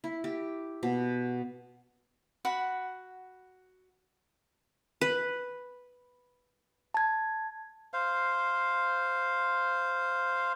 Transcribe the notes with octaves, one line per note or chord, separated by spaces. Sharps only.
E4
G4
B2
F#4 F#5 B5
B4
A5 G#6
C5 F5